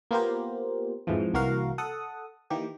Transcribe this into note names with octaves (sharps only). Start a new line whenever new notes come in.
A#3 B3 F4 G4 A#4 C5
F2 G#2 E3 F3
C2 E3 A#3 F#4 A#4 F5
A4 F#5 D#6
D#3 E3 A#3 G4